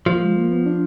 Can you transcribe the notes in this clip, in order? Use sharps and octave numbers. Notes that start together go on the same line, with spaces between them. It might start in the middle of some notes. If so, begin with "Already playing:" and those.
F3 A#3
G#3
A#3
B3
D4